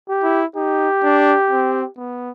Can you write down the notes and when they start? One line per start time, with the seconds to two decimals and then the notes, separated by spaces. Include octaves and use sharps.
0.09 G4
0.24 E4
0.56 D#4 G4
1.03 D4
1.51 C4
1.98 B3